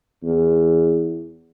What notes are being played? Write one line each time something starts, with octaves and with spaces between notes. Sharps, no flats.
E2